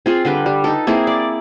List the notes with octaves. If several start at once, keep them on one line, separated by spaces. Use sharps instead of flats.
C4 F4 G#4
D3 G3 B4 G5
G3
D#4 A4
A#3 C4 E4 G#4
D5